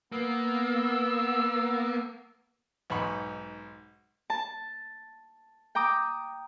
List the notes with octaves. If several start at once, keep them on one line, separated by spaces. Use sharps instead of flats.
A#3 B3 E6
B1 G#2 B5 C#6
A5
G5 A#5 D6 D#6